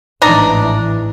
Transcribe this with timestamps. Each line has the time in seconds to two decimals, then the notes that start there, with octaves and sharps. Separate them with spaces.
0.22 A1 G#2 E3 D4 D#4 A#5